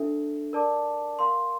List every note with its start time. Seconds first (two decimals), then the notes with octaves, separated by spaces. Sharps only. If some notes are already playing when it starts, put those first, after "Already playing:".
Already playing: D4 A4 E5
0.53 A#4 D5 A5 D6
1.19 A#4 F5 C6